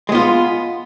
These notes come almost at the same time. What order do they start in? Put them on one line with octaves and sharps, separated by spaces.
G#3 B3 F4